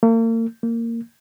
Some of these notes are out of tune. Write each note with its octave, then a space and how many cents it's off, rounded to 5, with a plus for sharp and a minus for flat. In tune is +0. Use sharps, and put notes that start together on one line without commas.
A#3 -40
A#3 -15